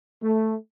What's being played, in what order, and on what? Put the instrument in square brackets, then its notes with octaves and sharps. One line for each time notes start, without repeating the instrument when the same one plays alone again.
[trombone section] A3